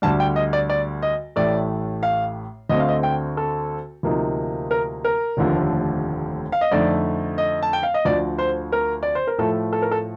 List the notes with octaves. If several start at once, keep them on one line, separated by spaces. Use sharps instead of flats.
D2 D3 G3 A5
G5
D#5
D5
D5
D#5
A1 A2 A3 D5
F5
D2 D3 A3 C4 D#5
F5
D#5
G5
A4
D2 C3 F3 A#3 D#4
A#4
A#4
F1 D#2 D3 F3 A3
F5
D#5
F2 D3 A3 D#4 D5
D#5
A5
G5
F5
D#5
D2 D3 F3 D5
C5
A#4
D5
C5
A#4
A2 F3 A3 A4
A4
A#4
A4